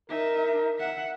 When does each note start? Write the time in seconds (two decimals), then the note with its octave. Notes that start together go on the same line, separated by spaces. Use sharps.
0.10 D#4 A#4 E5
0.79 E5 F#5